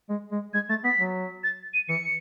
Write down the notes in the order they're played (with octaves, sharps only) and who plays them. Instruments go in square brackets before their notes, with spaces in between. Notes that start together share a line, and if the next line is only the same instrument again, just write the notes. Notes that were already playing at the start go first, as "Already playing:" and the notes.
[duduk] G#3
G#3
[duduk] G#3 [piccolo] G#6
[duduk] A3 [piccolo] A6
[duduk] B3 [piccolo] B6
[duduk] F#3
[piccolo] A6
D#7
[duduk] E3 [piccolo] C#7